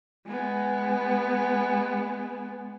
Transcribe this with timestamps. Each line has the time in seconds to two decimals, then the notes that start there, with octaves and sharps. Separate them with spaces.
0.27 G#3 B3